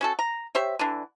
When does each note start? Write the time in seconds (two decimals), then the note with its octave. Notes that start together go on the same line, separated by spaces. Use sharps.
0.01 C#4 F#4 A4
0.19 A#5
0.55 G4 C5 C#5 E5
0.79 D3 E3 D4